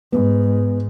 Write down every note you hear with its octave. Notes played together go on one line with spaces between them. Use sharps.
G#2 B3